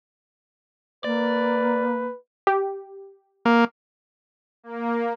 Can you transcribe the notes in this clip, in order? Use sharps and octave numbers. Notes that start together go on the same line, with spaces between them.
A#3 B4 D5
G4
A#3
A#3